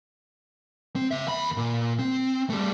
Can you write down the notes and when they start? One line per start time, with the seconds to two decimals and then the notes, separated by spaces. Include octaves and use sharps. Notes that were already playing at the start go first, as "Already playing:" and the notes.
0.96 C4
1.11 C#3 E5
1.27 D#2 B5
1.57 A#2
1.99 C4
2.50 G3 A3